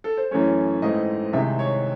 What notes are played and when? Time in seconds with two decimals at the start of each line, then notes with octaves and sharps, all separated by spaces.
0.04 A4
0.17 C5
0.31 F#2 E3 A3 C#4 C#5
0.82 G#2 E3 A3 C4 D#5
1.33 C2 C3 D#3 G#3 E5
1.59 C#5